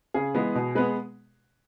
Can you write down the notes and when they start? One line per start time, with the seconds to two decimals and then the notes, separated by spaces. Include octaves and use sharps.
0.14 C#3 G#4
0.35 E3 G#3 B3
0.55 B2
0.75 G#3 B3 B4